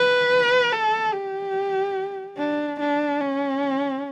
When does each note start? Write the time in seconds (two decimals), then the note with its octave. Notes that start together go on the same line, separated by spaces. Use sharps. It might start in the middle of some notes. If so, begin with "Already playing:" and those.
Already playing: B4
0.72 A4
1.13 G4
2.37 D4
2.80 D4
3.20 C#4